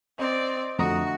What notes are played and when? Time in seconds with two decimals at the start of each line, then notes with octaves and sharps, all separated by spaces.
0.19 C4 D5 D#5
0.79 F2 D3 A3 F#4 A#5 D#6